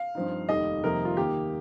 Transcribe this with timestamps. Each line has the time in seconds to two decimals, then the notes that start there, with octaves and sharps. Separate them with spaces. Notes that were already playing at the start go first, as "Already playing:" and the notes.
Already playing: F5
0.15 G2 F3 C4 D#4
0.49 F1 D#2 D#3 G3 D#5
0.83 F2 C3 D#3 G3 A#3 A#4
1.05 F4
1.17 D#2 D#3 A#3 D#4 G4